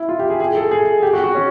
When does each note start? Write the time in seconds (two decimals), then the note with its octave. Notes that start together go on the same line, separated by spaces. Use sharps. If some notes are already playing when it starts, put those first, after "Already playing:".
Already playing: E4
0.09 F4
0.19 G4
0.30 G#4
0.40 G#4
0.56 A4
0.71 G#4
1.03 G4
1.13 F#4
1.24 F#4
1.35 C#4